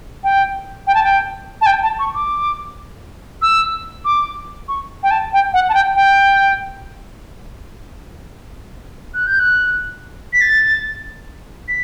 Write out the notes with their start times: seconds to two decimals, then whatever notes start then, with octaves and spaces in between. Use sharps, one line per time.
0.24 G5
0.87 G5
0.95 A5
1.04 G5
1.61 A5
1.66 G5
1.83 A5
1.99 C#6
2.15 D6
3.42 E6
4.05 D6
4.68 C#6
5.03 G5
5.11 A5
5.33 G5
5.53 F#5
5.69 A5
5.74 G5
5.96 G5
9.14 F#6
9.27 G6
9.39 F#6
10.33 B6
10.41 A6
11.68 B6